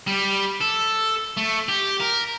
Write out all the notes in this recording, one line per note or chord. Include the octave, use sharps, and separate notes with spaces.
G3
A4
A3
G4
A#4